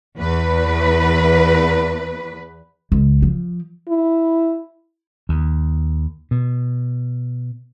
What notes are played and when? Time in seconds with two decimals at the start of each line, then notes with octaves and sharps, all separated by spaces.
0.17 E2 B4
2.92 C#2
3.22 F3
3.89 E4
5.29 D#2
6.31 B2